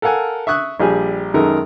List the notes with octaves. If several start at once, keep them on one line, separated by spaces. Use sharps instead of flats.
A4 A#4 F5 F#5 G#5
E5 C#6 D#6 F#6
A#1 G3 G4 G#4 G#5
F#2 D#3 G#3 D#4 A4 A#4